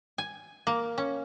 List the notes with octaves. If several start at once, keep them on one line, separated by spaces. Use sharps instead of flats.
G#5
A#3
C#4